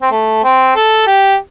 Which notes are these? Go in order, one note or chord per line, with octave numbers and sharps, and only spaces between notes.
C4
A3
C4
A4
G4